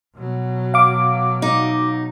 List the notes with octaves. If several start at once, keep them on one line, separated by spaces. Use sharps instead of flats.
B2 F#3
F5 D6
D#4